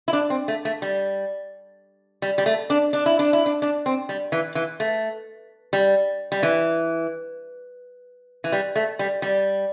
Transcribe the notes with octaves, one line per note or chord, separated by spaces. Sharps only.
E4
D4
C4
A3
A3
G3
G3
G3
A3
D4
D4
E4
D4
E4
D4
D4
C4
G3
E3
E3
A3
G3
G3
E3
E3
G3
A3
G3
G3